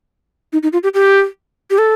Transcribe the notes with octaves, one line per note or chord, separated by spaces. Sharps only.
D#4
D#4
F4
G4
G4
G4
A4